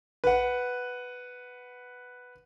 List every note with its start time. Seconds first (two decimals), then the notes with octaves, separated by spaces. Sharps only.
0.24 B4 F#5